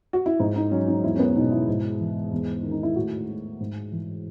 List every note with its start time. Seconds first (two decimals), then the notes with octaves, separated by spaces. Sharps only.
0.13 F#4
0.26 E4
0.40 G#2 D#4
0.56 D#4
0.71 F#3 C#4
0.88 D#4
1.04 E2 E4
1.15 C#4
1.20 B3
1.36 B2 D#4
1.52 E4
1.68 G#2
2.00 E3
2.32 E2
2.63 D#3
2.71 D#4
2.83 E4
2.96 A2 F#4
3.28 G#3
3.60 G#2
3.92 E3